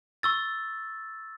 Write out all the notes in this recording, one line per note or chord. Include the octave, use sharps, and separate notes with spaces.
C#6 E6 A6